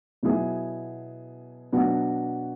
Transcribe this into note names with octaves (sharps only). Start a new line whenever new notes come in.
B2 F#3 B3 E4 G#4
B2 F#3 B3 D4 F#4